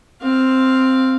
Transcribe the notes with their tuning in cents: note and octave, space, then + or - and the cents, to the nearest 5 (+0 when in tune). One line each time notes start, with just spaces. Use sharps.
C4 +0 F5 +0